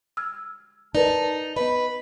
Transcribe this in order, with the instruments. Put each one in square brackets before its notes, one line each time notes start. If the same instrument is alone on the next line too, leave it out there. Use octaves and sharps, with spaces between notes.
[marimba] E6 F6 G#6
[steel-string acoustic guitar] D#4 [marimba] A#4 B4 D5 [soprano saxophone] A5
[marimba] B3 D#5 [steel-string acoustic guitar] B4 [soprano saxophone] B5